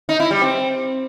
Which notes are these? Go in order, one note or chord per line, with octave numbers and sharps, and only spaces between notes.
D#4
E4
G3
C4